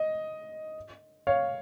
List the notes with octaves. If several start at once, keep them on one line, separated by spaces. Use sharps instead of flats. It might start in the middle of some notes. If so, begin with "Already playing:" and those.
Already playing: D#5
C#5 F5